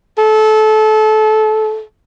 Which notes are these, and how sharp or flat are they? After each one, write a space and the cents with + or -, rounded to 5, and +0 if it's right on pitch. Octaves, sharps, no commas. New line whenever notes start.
A4 -25